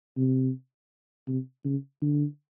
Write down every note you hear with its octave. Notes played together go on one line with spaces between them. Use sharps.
C3
C3
C#3
D3